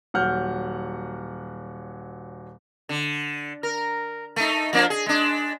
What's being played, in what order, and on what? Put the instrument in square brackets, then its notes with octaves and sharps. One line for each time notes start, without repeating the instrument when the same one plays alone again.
[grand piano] D#1 F#3 F#5 F6 G6
[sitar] D3
A#4
A3 D#4
F3 A#3 D4
G#4
G#3 D4